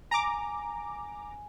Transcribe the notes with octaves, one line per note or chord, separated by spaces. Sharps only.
G#5 A#5 D6